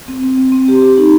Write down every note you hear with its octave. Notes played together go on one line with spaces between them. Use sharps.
C4
C4
C4
C4
G4
G4
D#4